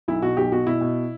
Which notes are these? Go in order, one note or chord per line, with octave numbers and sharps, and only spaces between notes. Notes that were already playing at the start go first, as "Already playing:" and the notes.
B1 E4
B2 F#4
B1 G4
B2 F#4
B2 E4
B2